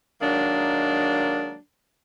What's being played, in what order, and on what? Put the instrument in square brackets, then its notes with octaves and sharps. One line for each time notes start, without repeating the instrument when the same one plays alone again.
[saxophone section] D#3 F#3 G#3 A#3 D4